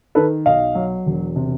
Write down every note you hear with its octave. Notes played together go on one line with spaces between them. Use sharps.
D#3 A4 B4
B1 D#5 F5
F#3
E1
C3